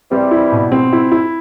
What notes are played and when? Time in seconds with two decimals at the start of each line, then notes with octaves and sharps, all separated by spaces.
0.10 E3 G3 C4
0.31 E4
0.52 B2
0.72 C4
0.93 E4
1.12 E4